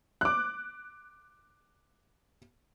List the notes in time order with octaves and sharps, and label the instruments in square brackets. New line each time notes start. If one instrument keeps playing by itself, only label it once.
[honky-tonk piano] D6 F#6